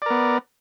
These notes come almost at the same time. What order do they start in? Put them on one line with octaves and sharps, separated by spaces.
D5 A#4 B3